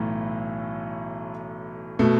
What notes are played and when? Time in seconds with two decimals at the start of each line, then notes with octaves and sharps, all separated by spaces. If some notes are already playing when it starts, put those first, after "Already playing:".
Already playing: B1 A2 E3 A3
1.99 B2 A3